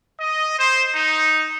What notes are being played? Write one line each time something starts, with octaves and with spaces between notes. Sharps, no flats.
D#5
C5
D#4